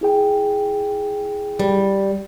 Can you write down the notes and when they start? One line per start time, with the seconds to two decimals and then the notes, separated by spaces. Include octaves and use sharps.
0.01 E4 G#4 G5
1.59 G3